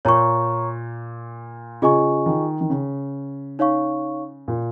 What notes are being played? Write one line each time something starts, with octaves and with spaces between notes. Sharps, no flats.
A#2 C#5 A#5 C#6
C#3 F4 G#4 D#5 G#5 C#6
D#3
D#3
C#3
D#4 C#5 F5 C#6
A#2